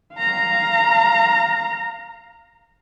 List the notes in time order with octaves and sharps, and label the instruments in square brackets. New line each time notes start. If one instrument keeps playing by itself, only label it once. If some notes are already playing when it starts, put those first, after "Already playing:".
[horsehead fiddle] F5 A#5